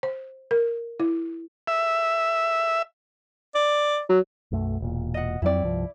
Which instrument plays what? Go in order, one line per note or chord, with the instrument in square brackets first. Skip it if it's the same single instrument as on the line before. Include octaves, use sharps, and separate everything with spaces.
[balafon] C5
A#4
E4
[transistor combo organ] E5
[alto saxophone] D5
[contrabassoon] F#3
[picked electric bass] B1 F#2 A3
E1 A#2
[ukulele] D#5 F#5
[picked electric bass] F2 F#3 C4 [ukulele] E4 D5
[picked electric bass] C2 G2 F3